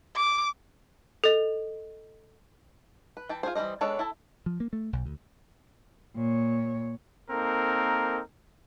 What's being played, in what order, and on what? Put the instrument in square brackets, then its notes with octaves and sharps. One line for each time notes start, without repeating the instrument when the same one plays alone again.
[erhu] D6
[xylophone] A4 D#5
[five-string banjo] B4
E3 G5 A5
F4 F#4 G#4 C5
E3 G3 B4 C5 D#5
G#3 B3 D4 A4 C#5
E4 A4 A5
[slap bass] F3
A#3
A3
B1
D2
[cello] A#2 C#5
[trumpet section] A#3 C4 D#4 A4 A#4